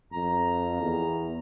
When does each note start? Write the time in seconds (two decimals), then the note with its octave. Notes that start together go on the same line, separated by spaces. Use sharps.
0.13 F2 A#5
0.82 E2